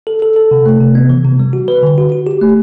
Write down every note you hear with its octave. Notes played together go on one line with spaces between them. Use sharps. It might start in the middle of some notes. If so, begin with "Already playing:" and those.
A4
A4
A4
C3
A3
C3
B3
E3
C3
G3
F#4
B4
D3
F#4
F#4
G4
A3